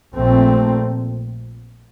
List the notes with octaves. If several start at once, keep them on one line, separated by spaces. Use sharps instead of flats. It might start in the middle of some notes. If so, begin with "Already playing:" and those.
A#1 A#2 A3 C4